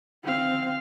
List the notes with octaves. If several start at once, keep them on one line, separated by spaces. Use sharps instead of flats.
C4 F5